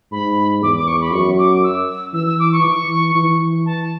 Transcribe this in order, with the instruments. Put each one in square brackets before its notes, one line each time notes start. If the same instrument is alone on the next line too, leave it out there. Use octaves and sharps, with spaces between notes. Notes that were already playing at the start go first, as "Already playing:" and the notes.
[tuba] G#2 [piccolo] B5
[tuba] E2 [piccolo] D6
[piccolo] D6
C#6
B5
[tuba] F#2 [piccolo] C#6
[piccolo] D6
E6
[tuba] E3 [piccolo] E6
[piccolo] E6
D6
C#6
[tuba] E3
E3
[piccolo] A5